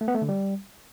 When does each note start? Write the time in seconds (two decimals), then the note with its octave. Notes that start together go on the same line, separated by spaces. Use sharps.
0.01 A3
0.08 B3
0.15 A3
0.22 D3
0.29 G3